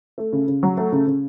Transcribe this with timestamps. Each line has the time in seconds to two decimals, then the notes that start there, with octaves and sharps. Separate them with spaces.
0.18 A3
0.33 C#3
0.48 C#3
0.63 F#3
0.77 A3
0.92 C#3
1.07 C#3